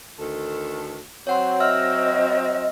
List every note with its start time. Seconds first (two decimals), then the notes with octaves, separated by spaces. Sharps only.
0.19 D2 D#3 A4
1.27 F#3 C4 C#5 F#5 C6
1.60 D#5 E5 E6 F6